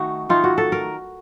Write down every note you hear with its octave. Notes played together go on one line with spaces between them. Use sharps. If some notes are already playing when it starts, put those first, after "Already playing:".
Already playing: D#3 A3 D#4 F#4
D#3 A3 D#4 F4
F#4
A4
A#4